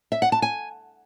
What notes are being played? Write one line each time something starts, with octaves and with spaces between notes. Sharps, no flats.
E5
F#5
A5
G#5